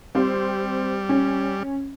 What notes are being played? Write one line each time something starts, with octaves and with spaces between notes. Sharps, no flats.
G3 C4 G4 C5
C#4